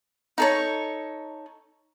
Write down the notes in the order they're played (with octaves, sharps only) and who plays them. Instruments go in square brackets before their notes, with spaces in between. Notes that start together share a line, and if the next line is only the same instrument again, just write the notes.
[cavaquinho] D#4 A4 C#5